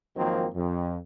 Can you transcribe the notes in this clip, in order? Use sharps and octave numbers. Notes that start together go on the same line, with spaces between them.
G#1 D#3 F3 F#3 A#3 C4
F2